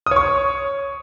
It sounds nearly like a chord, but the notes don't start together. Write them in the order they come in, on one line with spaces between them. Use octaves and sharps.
D#6 C#5 C#6